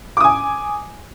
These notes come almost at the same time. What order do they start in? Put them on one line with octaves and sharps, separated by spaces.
D6 D#6 G#5